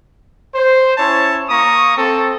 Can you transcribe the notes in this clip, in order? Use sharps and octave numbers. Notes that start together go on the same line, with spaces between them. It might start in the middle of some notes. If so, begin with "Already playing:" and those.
C5
C#4 E4 C#5 A5
A#3 A#5 C#6 D#6
C4 A4